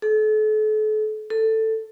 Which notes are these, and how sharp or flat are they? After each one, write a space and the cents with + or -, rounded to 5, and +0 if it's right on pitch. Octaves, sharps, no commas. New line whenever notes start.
A4 -40
A4 +10